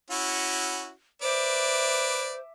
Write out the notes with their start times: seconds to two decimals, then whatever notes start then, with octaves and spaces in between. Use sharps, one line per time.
0.10 C#4 E4 F#4
1.22 B4 C5 D5 E5 D6